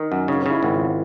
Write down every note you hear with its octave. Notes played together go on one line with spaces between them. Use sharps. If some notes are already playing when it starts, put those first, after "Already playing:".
Already playing: D#3
F#2
C#3 D#4
C#3
E4
G#1
F4